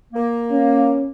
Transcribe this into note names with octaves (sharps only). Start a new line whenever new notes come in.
A#3
C#4